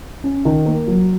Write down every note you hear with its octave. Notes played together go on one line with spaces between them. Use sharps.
C#4
D#3
A#3
F#3